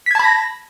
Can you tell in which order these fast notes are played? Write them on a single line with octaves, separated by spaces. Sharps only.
B6 G#6 A5 B5 A#6